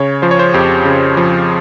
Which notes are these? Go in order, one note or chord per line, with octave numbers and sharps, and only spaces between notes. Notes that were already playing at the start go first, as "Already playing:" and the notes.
Already playing: C#3 C#5
F3 C5
C#5
C5
F2 G4
C#3
F3